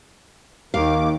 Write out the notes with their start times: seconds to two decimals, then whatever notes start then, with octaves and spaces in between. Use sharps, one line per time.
0.74 D#2 D#3 F5 D6